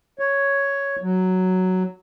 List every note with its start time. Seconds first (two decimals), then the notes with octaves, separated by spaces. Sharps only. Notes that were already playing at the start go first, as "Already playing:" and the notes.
0.19 C#5
1.02 F#3